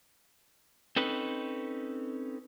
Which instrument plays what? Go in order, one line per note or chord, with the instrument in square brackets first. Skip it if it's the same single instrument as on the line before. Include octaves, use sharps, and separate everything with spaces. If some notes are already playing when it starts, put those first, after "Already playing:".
[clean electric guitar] C4 C#4 D#4 A4 B4